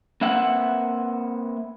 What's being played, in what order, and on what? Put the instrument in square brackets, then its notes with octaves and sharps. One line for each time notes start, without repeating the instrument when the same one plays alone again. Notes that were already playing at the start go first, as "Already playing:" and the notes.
[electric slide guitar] A#3 C4 B4 E5 F#5